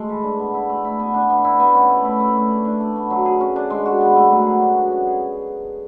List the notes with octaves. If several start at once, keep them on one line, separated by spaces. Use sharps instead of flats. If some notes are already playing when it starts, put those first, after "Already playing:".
Already playing: G#3 A3
E3
D4
B3
E4
A3
E4
B3
D4
B3
E4
B3
C#4
A3
E4
A3
D4
A3
D4
A3
B3
F#3
G#4
C#4
D4
G#3
F#4
B3
A3
F#3
G#4
D4
F#4
C#4
G#4